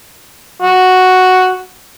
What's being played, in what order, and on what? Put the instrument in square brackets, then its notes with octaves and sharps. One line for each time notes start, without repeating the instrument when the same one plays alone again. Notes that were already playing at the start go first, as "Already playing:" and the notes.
[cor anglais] F#4